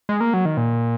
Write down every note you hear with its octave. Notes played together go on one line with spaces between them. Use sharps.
G#3
A#3
F#3
D#3
A#2